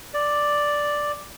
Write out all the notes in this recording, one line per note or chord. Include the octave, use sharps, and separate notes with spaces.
D5